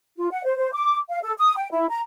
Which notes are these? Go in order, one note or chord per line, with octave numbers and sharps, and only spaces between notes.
F4
F#5
C5
C5
D6
F5
A4
D#6
G5
E4
A#5